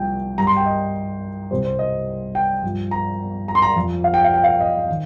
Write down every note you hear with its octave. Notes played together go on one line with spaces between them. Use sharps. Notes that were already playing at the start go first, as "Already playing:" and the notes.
Already playing: C2 A#2 F3 G5
G2 G3 A#5
C6
G5
D#5
C2 C3 G3 C5
C5
D#5
G5
G2 F3
A#5
A#5
C6
A#5
F2 F3
F5
G5
F5
G5
F5
D#5
D#3